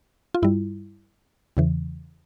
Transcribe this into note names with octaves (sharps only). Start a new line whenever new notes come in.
F4
G2 G3 E4
E2 C#3 E3